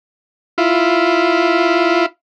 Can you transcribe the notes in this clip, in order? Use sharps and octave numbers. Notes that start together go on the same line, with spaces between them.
E4 F4